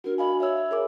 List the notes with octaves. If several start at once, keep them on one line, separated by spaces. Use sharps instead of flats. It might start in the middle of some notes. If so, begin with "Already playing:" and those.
D4 F#4 A#4
D#5 F5 G#5 B5
C#5 E5 E6
G#4 A#4 D6